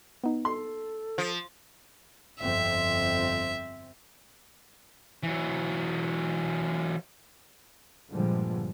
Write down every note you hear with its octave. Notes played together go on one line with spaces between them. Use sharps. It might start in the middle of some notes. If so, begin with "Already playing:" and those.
B3 D#4
A4 C6
F3
G1 F2 C4 E5
E3 F#3
G2 A#2 D3 F3 G3 G#3